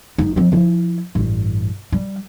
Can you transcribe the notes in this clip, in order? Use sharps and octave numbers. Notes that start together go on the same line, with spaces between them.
F#1 D#4
F3 C4
F3 E4
A1 G2
G3